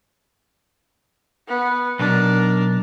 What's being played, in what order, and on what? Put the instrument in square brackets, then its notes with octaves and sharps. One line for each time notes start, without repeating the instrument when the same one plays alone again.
[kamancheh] B3
[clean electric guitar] B1 [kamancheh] D4 A#4